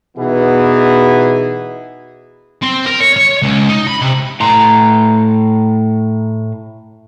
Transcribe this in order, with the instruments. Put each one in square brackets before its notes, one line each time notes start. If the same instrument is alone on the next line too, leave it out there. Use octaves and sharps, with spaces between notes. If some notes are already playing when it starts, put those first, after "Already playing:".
[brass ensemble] B2 E3 B3 D#4 G#4
[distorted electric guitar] C4
A#4
C#5
C#5
C#2
D#4
B5
C3
[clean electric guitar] A2 A#5 C6